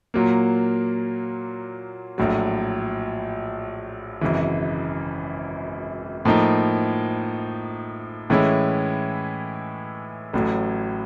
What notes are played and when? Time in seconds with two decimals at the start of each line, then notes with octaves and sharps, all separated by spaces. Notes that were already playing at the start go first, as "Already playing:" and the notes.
0.14 A#2 F#3 A#3
2.18 A#1 A2 F#3
4.21 G#1 F#2 C#3 E3
6.25 A2 F3 A#3 D#4
8.30 A2 E3 G#3 C#4 E4
10.33 A1 A2 F#3